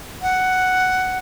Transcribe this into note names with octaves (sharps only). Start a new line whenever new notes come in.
F#5